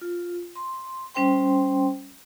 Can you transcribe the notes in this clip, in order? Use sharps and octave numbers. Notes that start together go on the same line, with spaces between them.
F4
C6
G3 C#4 C5 G5 C6